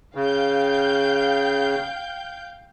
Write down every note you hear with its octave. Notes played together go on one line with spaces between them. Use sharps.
C#3 F5 G5 G6